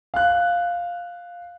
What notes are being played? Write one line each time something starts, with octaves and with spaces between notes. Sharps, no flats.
F5 F#6